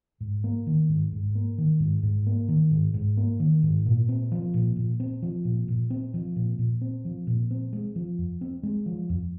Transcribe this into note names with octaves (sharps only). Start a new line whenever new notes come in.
G#2
A#3
D#3
G#2
G#2
A#3
D#3
G#2
G#2
A#3
D#3
G#2
G#2
A#3
D#3
G#2
A#2
C4
F3
A#2
A#2
C4
F3
A#2
A#2
C4
F3
A#2
A#2
C4
F3
A#2
C4
G#3
F3
F2
C4
G#3
F3
F2